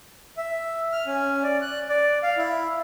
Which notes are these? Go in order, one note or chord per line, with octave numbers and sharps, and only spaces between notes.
E5
F6
C#4
D5
F#6
D5
F5
E4